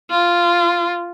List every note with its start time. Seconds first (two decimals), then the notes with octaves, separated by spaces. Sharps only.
0.10 F4